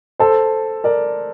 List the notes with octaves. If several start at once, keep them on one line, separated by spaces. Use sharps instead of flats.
A4 C5
A#4 D5